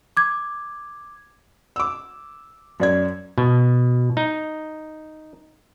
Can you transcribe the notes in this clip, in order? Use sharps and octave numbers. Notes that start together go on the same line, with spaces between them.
D6 G#6
D6 E6
F#2 D5 G#6
B2
D#4